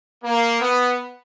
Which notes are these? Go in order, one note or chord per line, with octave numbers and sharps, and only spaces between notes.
A#3
B3